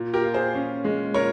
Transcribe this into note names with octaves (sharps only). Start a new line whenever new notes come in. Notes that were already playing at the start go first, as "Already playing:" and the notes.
Already playing: A#2
G4 A#4
F4
G#4 C5
C#4
G#3
A#2 A#4 C#5